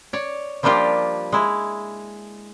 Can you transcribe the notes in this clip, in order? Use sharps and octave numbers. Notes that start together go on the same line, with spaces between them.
C#5 D5
F3 G3 A#3 D4 F4 G4
G#3 E4